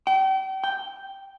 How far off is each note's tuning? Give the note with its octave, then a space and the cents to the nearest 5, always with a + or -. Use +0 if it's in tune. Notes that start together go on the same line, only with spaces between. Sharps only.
G5 -40
G5 +0